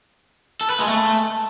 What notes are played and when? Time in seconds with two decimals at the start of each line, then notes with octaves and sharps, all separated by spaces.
0.61 A4
0.70 B4
0.79 G#3
0.88 A3